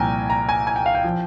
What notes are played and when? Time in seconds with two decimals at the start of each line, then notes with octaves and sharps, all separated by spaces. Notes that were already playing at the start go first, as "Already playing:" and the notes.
Already playing: C2 A#2 F3 G5 G#5 A#5
0.30 A#5
0.49 G#5
0.67 G#5
0.76 G5
0.86 F5
0.95 G5
1.04 F3